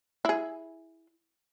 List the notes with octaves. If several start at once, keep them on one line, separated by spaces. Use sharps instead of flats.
E4 G#4